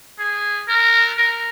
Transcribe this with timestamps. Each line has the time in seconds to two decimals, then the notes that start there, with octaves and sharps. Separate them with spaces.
0.19 G#4
0.68 A#4
1.18 A#4